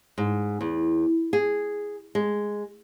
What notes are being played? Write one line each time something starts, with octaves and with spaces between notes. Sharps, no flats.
G#2
E2
G#4
G#3